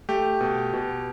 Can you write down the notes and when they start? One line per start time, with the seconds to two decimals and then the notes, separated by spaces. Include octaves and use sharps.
0.09 A3 G4
0.41 B2
0.73 B2